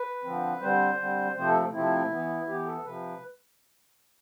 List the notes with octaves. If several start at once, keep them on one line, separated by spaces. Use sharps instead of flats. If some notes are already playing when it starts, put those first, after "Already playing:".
Already playing: B4
D3 F3 C4
D3 G3 C4 C5
D3 G3 C4
C3 F3 A3 C4 C5
A4
C3 F3 A3 C4 E4
E3 B3
E3 B3 G4
A4
C3 F3 B4